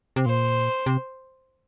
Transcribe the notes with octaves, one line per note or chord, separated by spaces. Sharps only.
C3
A#2 C5
C3